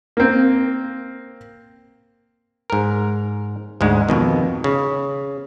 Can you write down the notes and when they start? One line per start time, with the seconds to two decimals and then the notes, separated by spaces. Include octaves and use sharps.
0.17 A#3 C4
2.70 G#2 A#4
3.81 D2 G#2 G#3
4.09 F2 B2 D#3
4.64 C#3